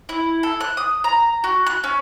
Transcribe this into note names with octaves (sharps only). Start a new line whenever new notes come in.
E4
A4
F#6
D#6
A#5
F#4
F#6
C#4